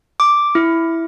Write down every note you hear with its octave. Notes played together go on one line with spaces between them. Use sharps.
D6
E4